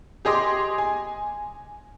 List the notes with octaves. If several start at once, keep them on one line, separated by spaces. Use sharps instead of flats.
G4 G#4 D#5 C6 D6
G#5